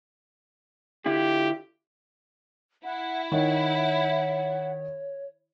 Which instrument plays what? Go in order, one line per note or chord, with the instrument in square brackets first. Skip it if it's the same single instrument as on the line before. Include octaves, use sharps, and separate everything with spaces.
[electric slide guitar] D3 E4 F4 [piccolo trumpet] G4
[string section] E4 [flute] F#5
[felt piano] D#3 [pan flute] C#5 [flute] F#5